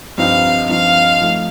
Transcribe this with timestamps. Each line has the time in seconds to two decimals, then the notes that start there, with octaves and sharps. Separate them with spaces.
0.18 G2 F3 C4 D#4 F5
0.69 G2 F3 C4 D#4 F5
1.21 F3 A3 D#4